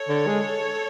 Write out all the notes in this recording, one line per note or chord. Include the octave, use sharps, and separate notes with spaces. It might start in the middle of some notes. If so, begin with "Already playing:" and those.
Already playing: A4 C#5
D3
G#3